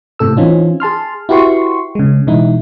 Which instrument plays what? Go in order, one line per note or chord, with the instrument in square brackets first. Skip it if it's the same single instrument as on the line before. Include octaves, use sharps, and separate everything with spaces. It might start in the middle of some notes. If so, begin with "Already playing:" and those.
[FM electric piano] A2 C3 A4 E6
E3 C4 C#4 D#4 F4
G#4 A5 C6 F6
E4 F#4 G4 B4 C6 C#6
C#3 G#3
B2 E3 G#3 D#4 E4